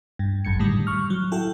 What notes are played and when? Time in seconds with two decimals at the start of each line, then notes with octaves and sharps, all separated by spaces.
0.19 G2
0.45 G#1 F#2 G#6 C#7
0.59 A2 D3 D#3 G3
0.87 C#6 F6
1.10 F#3
1.32 E4 F#4 A4 G5